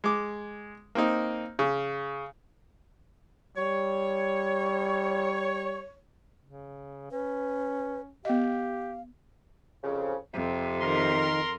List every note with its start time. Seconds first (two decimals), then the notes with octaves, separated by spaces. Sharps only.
0.04 G#3 D6
0.95 A#3 C4 D#4
1.59 C#3
3.57 G3 C#5
6.43 C#3
7.11 C#4 B4
8.25 B3 G4 D#5 F5
9.83 C2 F2 C#3
10.34 F2 C3
10.80 D#3 A#4 C6